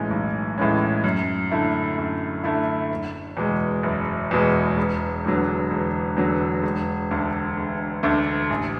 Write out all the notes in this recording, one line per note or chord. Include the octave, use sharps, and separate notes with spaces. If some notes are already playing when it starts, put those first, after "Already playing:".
Already playing: B1 A2 E3 G#3 C#4
B1
A2 E3 G#3 C#4
F#2
D3 A3 E4
F#2
D3 A3 E4
F#1
E2 B2 G#3
F#1
E2 B2 G#3
E1
E2 D3 F#3
E1
E2 D3 F#3
E1
D2 D3 A3
E1
D2 D3 A3
A1